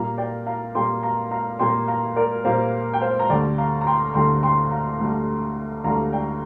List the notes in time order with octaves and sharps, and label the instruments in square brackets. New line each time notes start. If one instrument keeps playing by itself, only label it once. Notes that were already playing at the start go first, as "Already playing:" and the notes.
Already playing: [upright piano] A#2 G3 A#3 F5 A#5
D5 G5
F5 A#5
A#2 G3 A#3 G5 C6
F5 A#5
F5 A#5
A#2 G3 A#3 G5 C6
F5 A#5
A#4 D5
A#2 G3 A#3 C5 F5
G5
C5 F5
A#5
D2 D3 G3 D5 G5
F5 A#5
A#5
G5 C6
D2 D3 G3 G5 C6
G5 C6
F5 A#5
D2 D3 G3
D2 D3 G3 F5 A#5
D5 G5